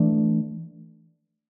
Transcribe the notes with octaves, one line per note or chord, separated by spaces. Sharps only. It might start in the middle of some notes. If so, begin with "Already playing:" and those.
Already playing: E3 A3 D4